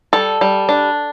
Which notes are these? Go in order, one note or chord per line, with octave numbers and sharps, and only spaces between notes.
G3 A4
G3
D4